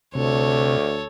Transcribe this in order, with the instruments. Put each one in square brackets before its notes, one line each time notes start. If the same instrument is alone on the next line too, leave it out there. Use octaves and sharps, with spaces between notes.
[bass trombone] D2 [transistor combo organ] C3 [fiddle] A4 C#5